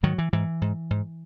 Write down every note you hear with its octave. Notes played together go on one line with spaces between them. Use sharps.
G#2 D#3 F#3
E3
G#2 E3
G#2
G#2